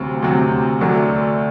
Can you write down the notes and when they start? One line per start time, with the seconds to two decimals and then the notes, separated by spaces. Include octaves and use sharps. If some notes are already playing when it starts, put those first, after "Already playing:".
Already playing: D2 C3 F#3 C4
0.22 D2 C3 F#3 C4
0.81 D2 D3 F#3 A3